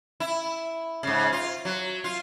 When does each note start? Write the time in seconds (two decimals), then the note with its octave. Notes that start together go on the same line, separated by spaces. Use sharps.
0.20 E4
1.03 G#2 C#3
1.33 F4
1.65 F#3
2.04 F4